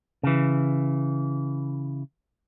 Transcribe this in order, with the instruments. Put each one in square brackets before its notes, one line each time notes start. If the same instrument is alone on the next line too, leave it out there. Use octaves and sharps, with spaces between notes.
[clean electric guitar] C#3 E3